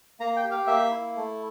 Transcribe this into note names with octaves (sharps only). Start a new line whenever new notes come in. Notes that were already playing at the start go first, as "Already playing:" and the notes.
A#3 A#5
G5
G4
F5
A#3 E5
E4
A3